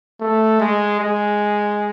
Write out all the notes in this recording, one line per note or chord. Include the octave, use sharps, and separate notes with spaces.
A3
G#3
G#3